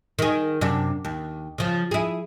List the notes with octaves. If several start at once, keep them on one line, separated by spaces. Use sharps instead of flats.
D#3 G#4
F#2 C3 D4
D#2
C#3 F3
E4 G#4